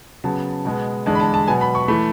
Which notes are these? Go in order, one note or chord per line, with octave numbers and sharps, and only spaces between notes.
C#3 F#3 B3 A5
B2 G#3 B3
E2 D3 G#3 A5
B5
A5
A5
B2 F#3 B3 G#5
B5
C#6
E3 A3 B5